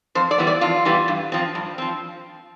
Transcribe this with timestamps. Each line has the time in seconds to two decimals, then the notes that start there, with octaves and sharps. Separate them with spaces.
0.15 F2 C5
0.31 D5
0.38 E3 G3 B3
0.47 D5
0.61 F2 F4
0.85 E3 G3 B3
1.08 G2
1.32 F3 C4
1.55 G2
1.78 F3 C4